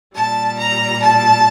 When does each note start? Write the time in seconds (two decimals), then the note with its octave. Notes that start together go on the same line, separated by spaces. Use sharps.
0.14 A#2 G3 A5
0.59 A#5
1.02 A5